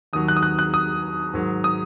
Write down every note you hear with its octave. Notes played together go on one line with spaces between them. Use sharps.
D#2 D#3 F#3 D#6
F#6
D#6
F#6
F#6
D#6
G#2 D#3 F#3
D#6